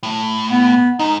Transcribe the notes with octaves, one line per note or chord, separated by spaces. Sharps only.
A2
B3
G#2 D#4